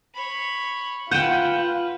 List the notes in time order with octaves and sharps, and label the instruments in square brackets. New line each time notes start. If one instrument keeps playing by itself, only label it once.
[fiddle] C#5 B5
[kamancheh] F4 [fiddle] B4 [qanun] F#5 G5 [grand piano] G6 D#7 E7